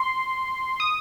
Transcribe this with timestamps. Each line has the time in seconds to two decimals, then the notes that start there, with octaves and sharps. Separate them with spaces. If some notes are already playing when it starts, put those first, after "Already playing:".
Already playing: C6
0.80 D#6